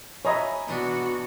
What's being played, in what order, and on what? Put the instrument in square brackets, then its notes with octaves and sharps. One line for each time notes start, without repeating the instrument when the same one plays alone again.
[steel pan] C#5 D#5 E5 [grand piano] G#5 A#5 B5
[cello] B2 F#4 [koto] E3 B3 D4